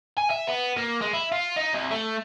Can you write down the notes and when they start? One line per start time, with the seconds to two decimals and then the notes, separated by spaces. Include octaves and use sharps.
0.18 G#5
0.31 E5
0.47 B3
0.77 A#3
1.01 G#3
1.13 E4
1.32 F4
1.56 D#4
1.73 C2
1.91 A3